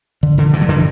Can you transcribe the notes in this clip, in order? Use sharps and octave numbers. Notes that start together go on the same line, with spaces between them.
D3
D3
G2 E3
F#3
D3 E3